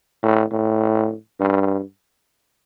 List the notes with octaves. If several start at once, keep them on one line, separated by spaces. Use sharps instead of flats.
A2
A2
G2